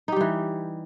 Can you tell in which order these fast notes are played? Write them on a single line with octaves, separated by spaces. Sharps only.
D#4 G4 G3 E3